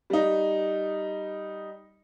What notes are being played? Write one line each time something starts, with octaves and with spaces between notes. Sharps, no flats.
G3 D#4